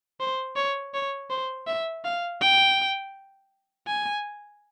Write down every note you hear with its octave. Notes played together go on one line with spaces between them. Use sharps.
C5
C#5
C#5
C5
E5
F5
G5
G#5